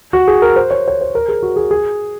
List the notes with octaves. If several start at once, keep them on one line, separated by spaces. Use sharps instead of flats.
F#4
G#4
A#4
C5
C#5
C#5
C5
A#4
G#4
F#4
G#4
G#4